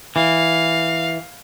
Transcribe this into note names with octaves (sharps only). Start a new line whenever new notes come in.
E3 F5